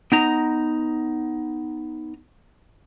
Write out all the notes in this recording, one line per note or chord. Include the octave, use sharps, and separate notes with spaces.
B3 D#4 A#5